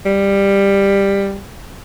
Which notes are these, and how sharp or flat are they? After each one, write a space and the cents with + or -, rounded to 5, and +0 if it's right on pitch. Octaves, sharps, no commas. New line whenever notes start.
G3 +15